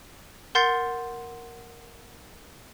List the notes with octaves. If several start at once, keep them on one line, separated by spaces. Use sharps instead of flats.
A#4 F#5 C6 G6 A6 C7